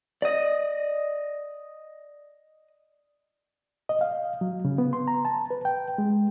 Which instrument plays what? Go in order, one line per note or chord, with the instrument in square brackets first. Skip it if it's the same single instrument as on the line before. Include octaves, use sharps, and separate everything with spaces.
[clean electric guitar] D5 D#5
[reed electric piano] D#5
F5
F#3
C#3
B3
C6
A#5
A5
B4
G5
G#3